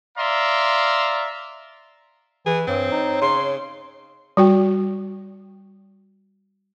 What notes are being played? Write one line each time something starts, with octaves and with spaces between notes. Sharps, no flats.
D5 E5 F5 A#5 C6
E3 G#4
G2 C4 C#5
D#4
C#3 C6
G3 F#4 G5